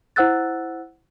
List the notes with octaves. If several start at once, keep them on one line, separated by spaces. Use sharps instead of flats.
E4 C5 F#5 E6 F#6 A6